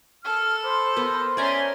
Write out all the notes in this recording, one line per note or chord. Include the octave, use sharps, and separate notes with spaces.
A4 F6
C5 B5 D6
B3 A#4
C#4 C#5 D5 E5 G#5 A#5 C6